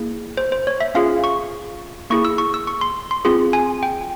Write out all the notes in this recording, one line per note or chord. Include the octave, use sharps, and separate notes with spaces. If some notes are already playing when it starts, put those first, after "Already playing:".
Already playing: A#3 E4 G#4
C5
C5
C#5
E5
C#4 F4 G#4 F5
C#6
A#3 E4 G#4 C#6
E6
C#6
E6
C#6
C6
C6
C4 F4 G#4 C6
G#5
G5